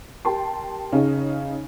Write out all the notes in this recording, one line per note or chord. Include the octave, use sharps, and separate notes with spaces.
G4 A#4 G5 A5 C6
C#3 C#4 D#4